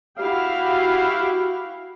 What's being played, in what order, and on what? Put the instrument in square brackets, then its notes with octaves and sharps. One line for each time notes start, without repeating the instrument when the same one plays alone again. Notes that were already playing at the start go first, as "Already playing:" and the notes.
[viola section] E4 F#4 G4 F5